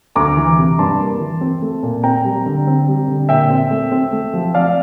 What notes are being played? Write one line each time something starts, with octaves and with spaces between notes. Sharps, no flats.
D2 A#5 D6
E3
C3
G2 A5 C6
A#3
E3
C4
A3
A#2
C4 G5 A#5
G3
D3
C4
G3
D3
A#2 E5 G5
C4
A3
C4
A3
F3
C4 D5 F5